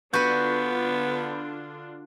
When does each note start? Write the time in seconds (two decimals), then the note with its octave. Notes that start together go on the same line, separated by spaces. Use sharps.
0.14 D3 B3 D4 F4 F#4 B4 B5 G6